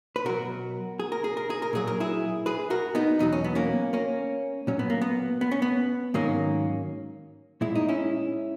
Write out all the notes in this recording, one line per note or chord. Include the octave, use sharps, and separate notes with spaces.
B4
B2 F#3 F#4 A#4
G#4
A#4
G#4
A#4
G#4
A#4
A#2 F#3 G#4
A#4
E4 G#4
G#4 B4
F#4 A#4
B3 D#4
E2 B2 F#3 D#4
C#4
B3
A#3 C#4
A#3 C#4
A#2 F#3 C#4
B3
A#3
B3
B3
C#4
B3
G#2 D#3 F#3 A#3 C#4
A#2 G#3 E4
D#4
C#4 E4